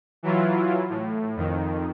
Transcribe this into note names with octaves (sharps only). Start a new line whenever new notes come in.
E3 F#3 E4 F4
A2
F2 D#3